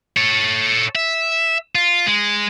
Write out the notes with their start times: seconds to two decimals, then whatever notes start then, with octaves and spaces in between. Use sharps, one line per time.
0.17 A4 C#5
0.95 E5
1.75 F4
2.07 G#3